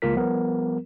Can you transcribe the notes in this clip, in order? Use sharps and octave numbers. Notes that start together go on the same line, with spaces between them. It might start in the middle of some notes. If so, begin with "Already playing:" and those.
C#2 A#3 F4 A#4 B6
F3 G3 B3 A#4